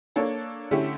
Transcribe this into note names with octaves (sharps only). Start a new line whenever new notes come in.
A#3 D4 A4 C#5
D3 A3 C#4 E4 G4